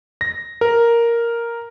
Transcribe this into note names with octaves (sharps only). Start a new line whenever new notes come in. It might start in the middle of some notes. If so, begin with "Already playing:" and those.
A#6
A#4